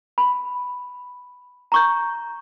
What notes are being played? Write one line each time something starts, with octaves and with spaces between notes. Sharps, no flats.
B5
A#5 C#6 G6